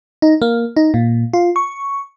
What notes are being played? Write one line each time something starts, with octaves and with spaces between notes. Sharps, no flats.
D#4
A#3
D#4
A#2
F4
C#6